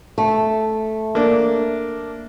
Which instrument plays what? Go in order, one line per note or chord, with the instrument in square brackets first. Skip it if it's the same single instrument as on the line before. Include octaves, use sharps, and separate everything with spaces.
[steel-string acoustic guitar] A3
[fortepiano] A#3 D4